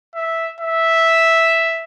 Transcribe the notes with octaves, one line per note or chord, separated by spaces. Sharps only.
E5
E5